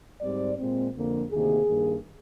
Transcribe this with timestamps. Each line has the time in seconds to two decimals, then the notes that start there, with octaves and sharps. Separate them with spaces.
0.21 G#2 G3 C4 D5
0.58 A#2 G#3 C4
0.94 F2 D3 F3 A#3
1.30 D2 C3 D#3 A#3 G#4
1.67 G2 D#3 A#3